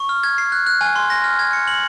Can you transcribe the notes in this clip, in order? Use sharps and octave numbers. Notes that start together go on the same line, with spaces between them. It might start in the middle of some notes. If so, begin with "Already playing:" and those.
Already playing: C#6
F6
G#6
C7
F#6
F#6
G#5
C6
A#6
F6
G#6
C#7
F#7